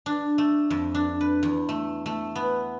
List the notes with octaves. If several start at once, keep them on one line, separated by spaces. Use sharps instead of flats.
D4
A3
F2
D4
B4
E2
A3
A3
B3